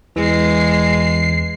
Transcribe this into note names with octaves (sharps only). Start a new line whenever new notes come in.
E2 E3 G#3 C7